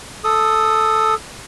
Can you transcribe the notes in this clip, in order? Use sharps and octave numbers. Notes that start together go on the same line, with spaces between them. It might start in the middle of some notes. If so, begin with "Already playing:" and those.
A4 D#6